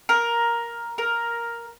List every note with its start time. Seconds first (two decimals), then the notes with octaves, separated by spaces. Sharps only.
0.09 A#4
0.98 A#4